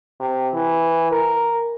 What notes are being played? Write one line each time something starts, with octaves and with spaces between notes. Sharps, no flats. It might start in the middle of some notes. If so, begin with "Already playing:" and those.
C3
E3
A#4